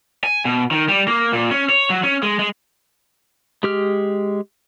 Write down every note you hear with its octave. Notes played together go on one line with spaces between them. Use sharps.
G#5
B2
D#3
G3
A#3
A#2
C#4
C#5
F#3
C#4
G#3
G#3
G#3 G4 F6